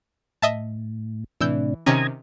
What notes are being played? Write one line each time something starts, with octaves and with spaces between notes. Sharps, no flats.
A2 D#5 E5 A5
A2 C3 E3 D4 E6 G6
C3 D#3 C#4 A#5 D#6 G#6